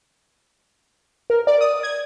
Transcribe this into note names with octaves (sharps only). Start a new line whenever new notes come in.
A#4
D5
D#6
G#6